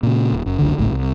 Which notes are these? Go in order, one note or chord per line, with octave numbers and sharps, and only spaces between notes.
A#2 C#3
D#1
F#1
F#1 C#2 D3
G#1 C#2 A2
C2